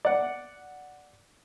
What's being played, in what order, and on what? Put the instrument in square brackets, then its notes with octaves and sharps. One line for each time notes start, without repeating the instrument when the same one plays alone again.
[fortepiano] D5 F#5